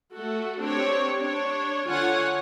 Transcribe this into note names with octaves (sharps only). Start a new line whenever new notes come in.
A3 F#4 A4
C4 D4 G4 C#5
D4 C#5
D3 F4 C#5 F#5 G#5